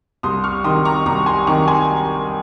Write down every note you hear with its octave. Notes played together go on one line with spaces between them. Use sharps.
C2 C6 D#6
C#6 F6
C3 D#3 C6 D#6
A#5 C#6
C2 A#5 C#6
G#5 C6
C3 D#3 A#5 C#6
G#5 C6